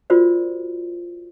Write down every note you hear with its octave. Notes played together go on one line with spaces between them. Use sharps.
F4 F#4 A#4 C5 D5